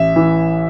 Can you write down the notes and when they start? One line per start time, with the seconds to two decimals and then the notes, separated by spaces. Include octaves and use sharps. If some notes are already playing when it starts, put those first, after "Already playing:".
Already playing: A1 E5
0.16 E3